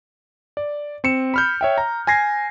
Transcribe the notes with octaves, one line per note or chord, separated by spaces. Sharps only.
D5
C4 C#7 E7
B5 F6 G6
C#5 E5 G5
A#5
G#5 G#6 A#6 C7